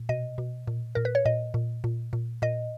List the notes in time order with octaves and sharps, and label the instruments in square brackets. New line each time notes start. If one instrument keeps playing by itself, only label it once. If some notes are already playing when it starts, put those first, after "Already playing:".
Already playing: [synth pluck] A#2
B2 D#5
B2
A#2
A#2 A#4
B4
C#5
A#2 D#5
A#2
A#2
A#2
A#2 D#5